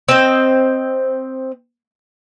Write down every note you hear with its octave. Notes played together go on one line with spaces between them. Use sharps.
C4 D#5